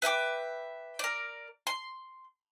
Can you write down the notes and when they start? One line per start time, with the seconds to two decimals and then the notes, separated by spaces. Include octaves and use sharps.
0.02 B4 E5 G5 D6
0.99 A#4 D5
1.67 C6